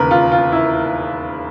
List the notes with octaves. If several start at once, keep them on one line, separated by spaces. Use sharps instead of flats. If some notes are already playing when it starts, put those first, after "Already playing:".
Already playing: E1 D#2 C#3 A#4 B4
F4
F4
E4